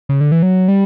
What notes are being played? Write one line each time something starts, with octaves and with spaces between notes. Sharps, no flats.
C#3
D3
E3
F#3
G3